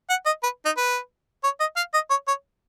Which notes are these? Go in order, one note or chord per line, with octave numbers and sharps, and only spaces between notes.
F#5
D#5
B4
D#4
B4
C#5
D#5
F5
D#5
C#5
C#5